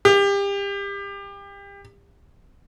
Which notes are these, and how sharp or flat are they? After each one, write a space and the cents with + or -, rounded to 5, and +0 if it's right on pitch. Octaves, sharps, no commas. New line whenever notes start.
G4 +30